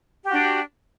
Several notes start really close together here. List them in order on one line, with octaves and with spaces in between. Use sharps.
G4 F#4 D4